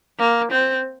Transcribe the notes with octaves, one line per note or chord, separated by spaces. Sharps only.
A#3
C4